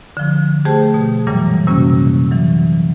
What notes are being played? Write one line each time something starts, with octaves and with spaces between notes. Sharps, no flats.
D3 F3
A3 G4 G#4 C5 G5 A5
B2
F#2 A#2 C#3 E3 F#3 G3
C3 G3 A#3 C#4 F#4
E3 F#3